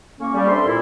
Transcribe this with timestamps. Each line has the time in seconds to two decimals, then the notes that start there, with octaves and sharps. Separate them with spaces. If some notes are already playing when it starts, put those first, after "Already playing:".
0.19 A2 A#3 C#4 C#6
0.33 G3
0.47 G2 C4 D4 A4 E5 C6
0.65 A#2 E4